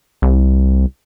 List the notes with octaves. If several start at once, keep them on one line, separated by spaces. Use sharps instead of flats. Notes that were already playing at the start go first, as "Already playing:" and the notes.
C2